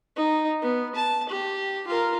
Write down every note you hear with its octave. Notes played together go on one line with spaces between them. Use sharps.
D#4
B3
A5
G4
F4 A#4